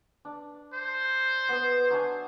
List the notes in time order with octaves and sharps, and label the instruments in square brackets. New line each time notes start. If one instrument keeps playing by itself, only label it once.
[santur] D4
[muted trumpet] C5
[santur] B3 D#6
F#3 D4 G#5